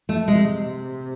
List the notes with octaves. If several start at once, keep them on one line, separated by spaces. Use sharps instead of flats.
A3
C3 G#3